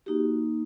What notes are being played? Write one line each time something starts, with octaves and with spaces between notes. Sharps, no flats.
A#3 D#4 F#4 G4